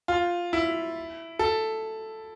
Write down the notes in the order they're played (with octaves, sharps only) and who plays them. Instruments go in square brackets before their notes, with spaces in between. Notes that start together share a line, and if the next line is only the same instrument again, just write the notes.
[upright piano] F4
E4
A4